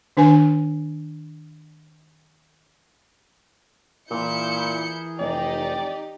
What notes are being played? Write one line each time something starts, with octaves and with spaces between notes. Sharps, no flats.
D#3 D4 B4 G#5
A#2 E3 E4 G#4 A#4 G6 C#7
F1 D#4 G4 D5